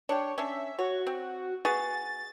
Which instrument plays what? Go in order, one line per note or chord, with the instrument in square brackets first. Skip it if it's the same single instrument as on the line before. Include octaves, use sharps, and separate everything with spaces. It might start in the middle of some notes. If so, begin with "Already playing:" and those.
[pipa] D4 G4 [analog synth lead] C#5
[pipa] C#4 D4 [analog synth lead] E5
[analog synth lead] F#4 [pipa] C#5
[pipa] C4
[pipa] B3 F#4 G#4 [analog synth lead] A6